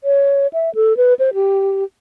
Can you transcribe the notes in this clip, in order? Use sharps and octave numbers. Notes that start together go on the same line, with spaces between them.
C#5
E5
A4
B4
C5
G4